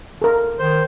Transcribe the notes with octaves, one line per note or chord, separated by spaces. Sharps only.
A4 A#4
D#3 C5